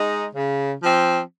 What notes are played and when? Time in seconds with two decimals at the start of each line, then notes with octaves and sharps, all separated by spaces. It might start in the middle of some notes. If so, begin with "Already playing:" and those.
Already playing: G#3 D#4
0.35 C#3
0.82 F3 C4